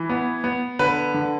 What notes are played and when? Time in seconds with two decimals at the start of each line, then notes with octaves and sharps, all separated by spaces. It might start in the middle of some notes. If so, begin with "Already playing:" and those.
Already playing: E3
0.09 B3
0.44 B3
0.79 D3 B4
1.14 D3